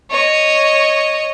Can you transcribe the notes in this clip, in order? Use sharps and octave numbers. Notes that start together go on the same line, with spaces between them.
C#5 D#5